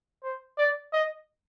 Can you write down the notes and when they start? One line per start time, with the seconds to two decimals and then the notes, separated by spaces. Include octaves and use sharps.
0.23 C5
0.58 D5
0.93 D#5